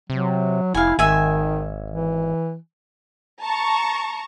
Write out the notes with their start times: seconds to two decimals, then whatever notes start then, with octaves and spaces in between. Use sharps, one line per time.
0.10 C3 F#3
0.75 F1 E4 F5 G#5
0.99 G#1 D#3 E5 G#5
1.90 E3
3.43 A5 A#5 C#6